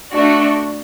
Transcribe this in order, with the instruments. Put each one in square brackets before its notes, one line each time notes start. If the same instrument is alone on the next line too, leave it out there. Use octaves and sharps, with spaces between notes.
[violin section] A3 D4 F#4